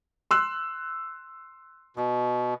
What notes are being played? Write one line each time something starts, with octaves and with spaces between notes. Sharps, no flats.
C6 E6 F#6
B2